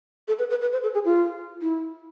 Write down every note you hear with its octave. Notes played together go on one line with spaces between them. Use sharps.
A4
B4
B4
B4
C5
A4
G#4
F4
E4